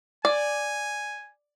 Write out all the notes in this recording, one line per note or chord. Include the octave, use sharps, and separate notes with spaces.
D5 G#5